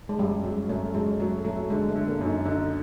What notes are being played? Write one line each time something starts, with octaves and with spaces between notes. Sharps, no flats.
G#3
F#2 G3
F#3 G#3
F#2 A3
F#3 G#3
F#3 A3
F#3 A3
D3 G#3
A3
D3
A#3
F#2
D#4
D3 D#4